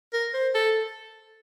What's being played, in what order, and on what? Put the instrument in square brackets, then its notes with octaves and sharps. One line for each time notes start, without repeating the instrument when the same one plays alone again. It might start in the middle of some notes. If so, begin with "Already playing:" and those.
[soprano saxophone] A#4
C5
A4